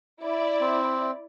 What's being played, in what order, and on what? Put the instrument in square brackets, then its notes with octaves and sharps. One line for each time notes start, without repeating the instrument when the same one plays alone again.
[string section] E4 D5
[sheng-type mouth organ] C4